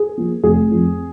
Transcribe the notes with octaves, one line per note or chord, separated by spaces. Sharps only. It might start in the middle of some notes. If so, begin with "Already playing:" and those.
Already playing: G#4
F3 A#3
F1 G#4
F2 F3